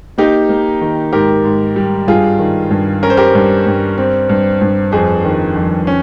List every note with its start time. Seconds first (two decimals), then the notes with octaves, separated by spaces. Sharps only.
0.18 A#3 D#4 G4
0.49 A#3
0.81 D#3
1.13 G#2 G4 A#4
1.44 G#2
1.76 G3
2.08 G2 F4 G#4
2.39 D#3
2.71 G2
3.03 C#4 A#4
3.10 C5
3.17 G4 A#4
3.35 G2
3.66 G2
3.98 C4
4.29 G2
4.61 G2
4.92 F2 G#4 C5
5.24 D#3
5.56 F2
5.87 C#4